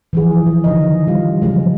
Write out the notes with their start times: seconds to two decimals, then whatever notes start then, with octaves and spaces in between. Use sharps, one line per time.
0.13 E3 F3 G#4
0.47 F3
0.64 D3 D#3 D#5
1.07 G3 F4 F5
1.42 C#3 F3 F#3 G#3